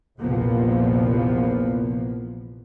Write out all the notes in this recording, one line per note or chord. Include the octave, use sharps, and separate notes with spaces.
A#1 E2 C3 F3 A#3 B3